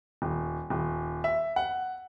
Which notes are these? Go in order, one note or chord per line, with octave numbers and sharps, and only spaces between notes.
D#1
D#1
E5
F#5